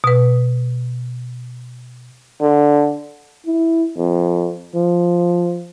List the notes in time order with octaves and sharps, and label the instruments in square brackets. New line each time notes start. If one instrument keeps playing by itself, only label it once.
[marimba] B2 B4
[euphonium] D3
E4
F2
F3